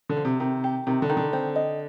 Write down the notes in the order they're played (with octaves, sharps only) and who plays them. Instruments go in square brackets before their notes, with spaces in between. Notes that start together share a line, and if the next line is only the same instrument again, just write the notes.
[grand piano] D3
[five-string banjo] F3
[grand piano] C3
[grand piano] C3 [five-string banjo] D#3
[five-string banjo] G4
[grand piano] C3 [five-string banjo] D#3
[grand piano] D3
[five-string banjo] D#3
[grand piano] D3
[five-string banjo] C4
D#5